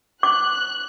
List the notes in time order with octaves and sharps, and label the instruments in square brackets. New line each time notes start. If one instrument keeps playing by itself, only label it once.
[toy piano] D6 [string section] F#6